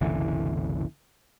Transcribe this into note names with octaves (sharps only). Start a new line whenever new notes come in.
F#1 C2 D3 E3